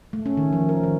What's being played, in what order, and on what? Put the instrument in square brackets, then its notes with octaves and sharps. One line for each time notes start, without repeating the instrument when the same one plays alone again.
[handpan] A3
C#4
D#3
F3
A#4
D#3